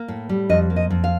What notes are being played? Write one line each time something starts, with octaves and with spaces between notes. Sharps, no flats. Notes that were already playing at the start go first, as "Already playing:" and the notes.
Already playing: A#3
A2
G3
F2 D#5
A#3
D#5
F2
F5